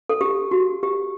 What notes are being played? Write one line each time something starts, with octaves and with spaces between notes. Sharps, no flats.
A4
G4
F#4
G4